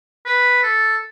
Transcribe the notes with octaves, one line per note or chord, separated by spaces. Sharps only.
B4
A4